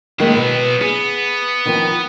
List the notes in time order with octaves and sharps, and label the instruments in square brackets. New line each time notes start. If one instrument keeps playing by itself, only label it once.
[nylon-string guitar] D#3 G#3 A#3 [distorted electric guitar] F#3 B3
[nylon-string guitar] B2
[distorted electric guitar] B3 [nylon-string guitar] G#4
[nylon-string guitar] D#3 F3 C4